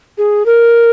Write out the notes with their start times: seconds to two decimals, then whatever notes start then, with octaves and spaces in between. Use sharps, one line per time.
0.18 G#4
0.46 A#4